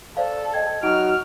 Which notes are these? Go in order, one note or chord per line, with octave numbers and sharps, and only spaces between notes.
A4 C5 D5 F5
D#5 G5 G#6
F#3 D#4 F#4 F6 D7